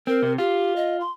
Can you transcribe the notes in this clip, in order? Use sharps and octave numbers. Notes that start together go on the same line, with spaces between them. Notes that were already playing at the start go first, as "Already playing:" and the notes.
C4 A#4
C3
F4 G4
D#5
C6